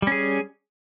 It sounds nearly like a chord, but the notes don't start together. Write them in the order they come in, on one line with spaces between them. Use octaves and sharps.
G3 C#4 G#4